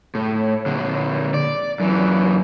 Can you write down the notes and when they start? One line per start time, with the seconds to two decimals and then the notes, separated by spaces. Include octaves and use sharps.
0.15 A2
0.66 A#2 D3
1.34 D5
1.80 F#2 E3